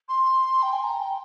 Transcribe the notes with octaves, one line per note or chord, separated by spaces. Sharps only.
C6
G5
G#5
A#5
G5